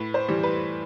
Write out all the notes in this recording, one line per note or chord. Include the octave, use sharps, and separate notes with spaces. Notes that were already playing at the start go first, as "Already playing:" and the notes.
Already playing: A2 B4
C5
E3 G3
B4